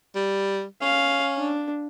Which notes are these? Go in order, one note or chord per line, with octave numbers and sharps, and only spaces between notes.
G3
C#4 F5
D4